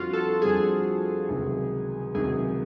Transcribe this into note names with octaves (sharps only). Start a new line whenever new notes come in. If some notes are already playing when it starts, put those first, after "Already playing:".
Already playing: F2 D3 G3 C4 F4 F#4
A4
F2 D3 G3 C4 G#4
C#2 C3 D#3 F#3
C#2 C3 D#3 F#3 G#4